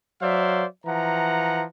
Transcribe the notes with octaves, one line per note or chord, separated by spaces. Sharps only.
F#3 C5 D5 E5 F5
E3 F3 F#5 A#5